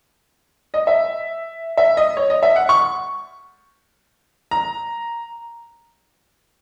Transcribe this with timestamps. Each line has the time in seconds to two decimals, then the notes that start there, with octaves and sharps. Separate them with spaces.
0.74 D#5
0.87 E5
1.77 E5
1.97 D#5
2.17 C#5
2.30 D#5
2.43 E5
2.56 F#5
2.69 C#6
4.51 A#5